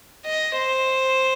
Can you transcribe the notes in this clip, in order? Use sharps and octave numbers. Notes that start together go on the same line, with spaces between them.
D#5
C5